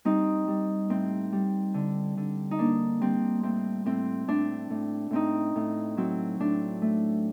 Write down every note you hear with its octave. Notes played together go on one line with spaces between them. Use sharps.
G3 C4 D#4
G3
A2 C4
G3
D3
D3
D#4
A#3 D4
G3 C4
A2 C4
A2 C4
A2 D4
A2
A2 C4 D#4
A2
F#3 C4
A2 D4
A3